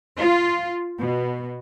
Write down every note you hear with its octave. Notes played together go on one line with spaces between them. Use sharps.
F4
B2